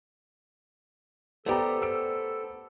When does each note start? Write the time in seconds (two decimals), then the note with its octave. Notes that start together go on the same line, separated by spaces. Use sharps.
1.46 A3 B3 G4 A4 C5 D5 A#5
1.81 C5 E6 D7